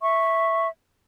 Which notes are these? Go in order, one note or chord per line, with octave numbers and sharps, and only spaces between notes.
E5 C#6